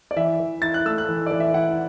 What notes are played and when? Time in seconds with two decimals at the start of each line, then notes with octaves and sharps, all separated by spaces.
0.11 D5
0.16 E3 E5
0.40 E3
0.62 E4 A6
0.74 F#6
0.85 A3 E6
0.98 F#6
1.08 E3
1.26 E3 D5
1.40 E5
1.54 E4 F#5